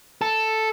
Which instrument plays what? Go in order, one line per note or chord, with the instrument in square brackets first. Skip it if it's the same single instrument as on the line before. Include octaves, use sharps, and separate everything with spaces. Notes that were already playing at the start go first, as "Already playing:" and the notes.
[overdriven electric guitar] A4